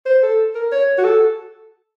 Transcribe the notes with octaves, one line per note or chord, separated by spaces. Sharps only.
C5
A4
A#4
C#5
F#4
A4